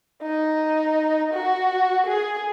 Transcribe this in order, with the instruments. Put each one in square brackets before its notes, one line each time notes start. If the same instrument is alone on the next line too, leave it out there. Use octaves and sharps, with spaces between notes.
[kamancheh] D#4
F#4
G#4